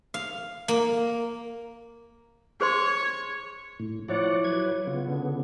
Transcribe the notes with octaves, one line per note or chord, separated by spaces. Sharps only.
F5
A#3
G#4 C5 C#5 C6
A2
F3 E4 C#5 D5 F#5 D6
F#3 B4 G#6
C#3 B3 F4
D3